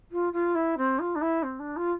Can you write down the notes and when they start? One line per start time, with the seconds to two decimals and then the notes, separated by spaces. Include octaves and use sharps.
0.11 F4
0.32 F4
0.55 E4
0.77 C4
0.99 F4
1.15 D4
1.21 E4
1.43 C4
1.59 D4
1.76 F4